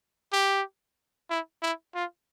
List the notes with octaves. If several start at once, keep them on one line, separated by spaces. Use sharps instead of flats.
G4
E4
E4
F4